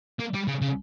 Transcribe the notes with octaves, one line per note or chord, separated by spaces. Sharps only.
A#3
G3
C#3
C#3